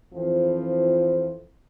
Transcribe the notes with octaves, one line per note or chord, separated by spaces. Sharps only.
F2 E3 F3 C4